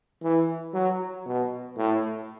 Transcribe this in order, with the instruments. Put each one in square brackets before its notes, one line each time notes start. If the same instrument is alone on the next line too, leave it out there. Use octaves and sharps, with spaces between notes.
[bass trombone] E3
F#3
B2
A2